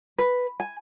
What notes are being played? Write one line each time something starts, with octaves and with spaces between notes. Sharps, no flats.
B4
G#5